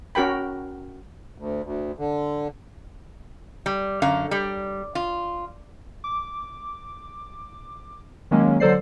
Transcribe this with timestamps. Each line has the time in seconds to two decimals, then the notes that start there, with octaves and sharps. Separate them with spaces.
0.15 C#4 F#4 A#4 G5 B5
1.38 D2
1.64 D2
1.99 D3
3.66 G3
4.02 F#2 D3 F5
4.31 G3
4.95 F4
6.04 D6
8.31 D#3 F#3 G#3 A#3 C#4
8.60 D3 F#3 A4 C5 D5 C7